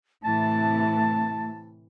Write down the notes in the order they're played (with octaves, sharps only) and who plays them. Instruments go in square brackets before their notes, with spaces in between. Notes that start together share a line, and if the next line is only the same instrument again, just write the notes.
[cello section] A2 C3 E3 [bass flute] A3 [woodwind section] A5